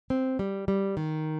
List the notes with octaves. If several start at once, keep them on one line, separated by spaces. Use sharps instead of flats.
C4
G3
G3
D#3